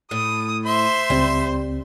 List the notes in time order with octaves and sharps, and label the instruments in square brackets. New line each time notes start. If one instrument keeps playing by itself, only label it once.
[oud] A2 [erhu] D#6
[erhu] C5 [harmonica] E5 C6
[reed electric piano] C#2 C4 [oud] G3